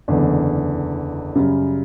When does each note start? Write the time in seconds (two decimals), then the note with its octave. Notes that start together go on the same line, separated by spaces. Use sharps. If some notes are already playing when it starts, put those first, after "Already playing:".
0.08 F#1 E2 D3
1.35 F#2 C#3 G3